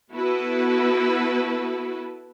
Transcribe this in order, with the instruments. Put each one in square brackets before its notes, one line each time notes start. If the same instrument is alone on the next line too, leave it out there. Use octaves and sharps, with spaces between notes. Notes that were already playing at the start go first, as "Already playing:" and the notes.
[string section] B3 E4 F#4 A4 B4